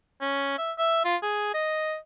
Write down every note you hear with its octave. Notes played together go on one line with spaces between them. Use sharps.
C#4
E5
E5
F4
G#4
D#5